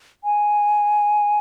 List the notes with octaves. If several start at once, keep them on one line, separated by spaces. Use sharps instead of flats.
G#5